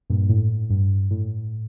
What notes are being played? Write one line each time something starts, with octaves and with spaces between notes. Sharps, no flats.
G2 A#2
A2
G2
A2